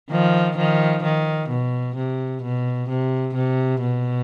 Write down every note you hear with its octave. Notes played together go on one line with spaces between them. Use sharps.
D#3 F3
D#3 F3
D#3
B2
C3
B2
C3
C3
B2